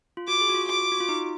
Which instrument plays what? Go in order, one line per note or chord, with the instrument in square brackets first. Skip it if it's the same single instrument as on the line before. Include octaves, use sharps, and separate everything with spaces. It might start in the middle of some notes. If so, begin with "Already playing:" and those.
[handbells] F4
[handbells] F#4 [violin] D6
[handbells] G#4
F#4
F4
[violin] D6
[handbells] F#4
F4
D#4